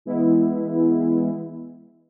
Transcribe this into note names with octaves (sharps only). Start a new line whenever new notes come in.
E3 G#3 B3 E4